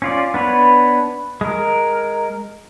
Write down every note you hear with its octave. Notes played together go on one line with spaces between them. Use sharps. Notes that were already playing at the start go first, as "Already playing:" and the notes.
C#4 F4 D5
B3 D4 B4 C#5
G#3 A#4